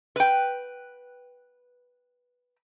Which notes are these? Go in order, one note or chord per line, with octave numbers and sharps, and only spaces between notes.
B4 G5